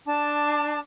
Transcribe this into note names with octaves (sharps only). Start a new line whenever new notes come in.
D4 A5 D6